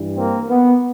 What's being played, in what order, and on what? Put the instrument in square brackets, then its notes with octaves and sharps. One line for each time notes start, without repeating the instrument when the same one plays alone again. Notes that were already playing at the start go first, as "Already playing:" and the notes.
Already playing: [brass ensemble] G2 E3 G3
A#3 C4
B3